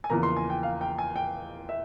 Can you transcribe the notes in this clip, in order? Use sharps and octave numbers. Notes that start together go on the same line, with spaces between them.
G#5
E2 C#3 F3 A#3 A#5
C6
G#5
G5
F5
G5
G#5
G5
E5